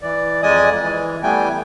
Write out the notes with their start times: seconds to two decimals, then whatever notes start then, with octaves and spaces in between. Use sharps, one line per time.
0.02 E3 D5
0.43 F2 G#3 D5 D#5 G#5 D#6
0.81 E3
1.23 E3 G3 A3 B3 G5 G#5